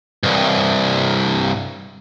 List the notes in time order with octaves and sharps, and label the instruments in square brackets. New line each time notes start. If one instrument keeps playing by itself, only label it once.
[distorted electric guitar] C2 G2